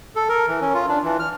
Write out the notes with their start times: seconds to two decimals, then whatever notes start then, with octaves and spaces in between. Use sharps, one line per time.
0.16 A4
0.29 A#4
0.48 E3
0.61 C#4
0.74 F4
0.88 D4
1.04 E3
1.20 F6